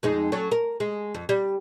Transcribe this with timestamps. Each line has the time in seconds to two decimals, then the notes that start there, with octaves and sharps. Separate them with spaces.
0.03 F2 G#3 D#4
0.32 F#3 C#4 A4
0.52 A#4
0.80 G#3
1.15 F2
1.29 G3